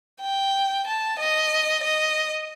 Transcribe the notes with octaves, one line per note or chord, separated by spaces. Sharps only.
G5
A5
D#5
D#5